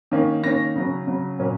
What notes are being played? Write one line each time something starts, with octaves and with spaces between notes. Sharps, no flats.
D#3 A#3 C#4
D#3 A#3 C#4 A#6
C#3 F#3 C#4
C#3 F#3 C#4
A#2 F#3 C#4